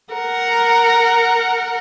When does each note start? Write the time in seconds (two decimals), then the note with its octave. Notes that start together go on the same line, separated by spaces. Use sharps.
0.14 A#4 F#5